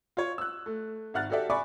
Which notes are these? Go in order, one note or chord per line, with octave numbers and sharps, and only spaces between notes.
F4 C#5
E6 F#6
A3
G#1 E5 F#5 F6 F#6 A6
F#4 G4 A4 D5 E5
D5 E5 G#5 B5 C#6 D6